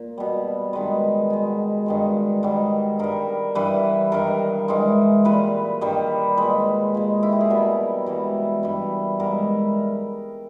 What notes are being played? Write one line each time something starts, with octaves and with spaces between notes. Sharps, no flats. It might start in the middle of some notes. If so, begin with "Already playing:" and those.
Already playing: A#2
B2 G3
G2 D#3 G#3 B4
B2 G#3
G2 D#3 G#3
G#2 D#3 G3
G2 G3 A#4
G2 E3 G3 B4
G2 D#3 G3 A#4
G#2 E3 G#3
A#2 G3 B4
G2 D#3 G3
A#2 G#3 B4
A#2 G#3
E4
G4
G#4
B2 G3 A#4
G#2 E3 G3
G2 G3
G#2 G3 A#4